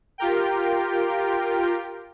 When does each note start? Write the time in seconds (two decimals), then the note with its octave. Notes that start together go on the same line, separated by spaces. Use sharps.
0.18 F4 G4 A#4 G5